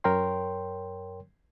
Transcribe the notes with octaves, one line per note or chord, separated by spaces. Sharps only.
F#2 A#4 C#5 G5 C6